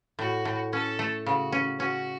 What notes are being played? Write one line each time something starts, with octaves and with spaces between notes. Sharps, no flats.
A2 F#4
A2
C#4 A4
A3
C#3 F#4
C#4
C#4 F#4